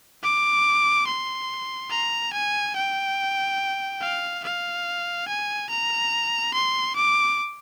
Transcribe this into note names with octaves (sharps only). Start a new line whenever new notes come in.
D6
C6
A#5
G#5
G5
F5
F5
G#5
A#5
C6
D6